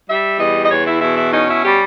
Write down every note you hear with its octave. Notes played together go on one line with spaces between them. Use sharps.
G3 E5
E2 D#5
D#5
E2 C#5
E4
B2 E4
E4
C#4 D#4
E4
G3 G4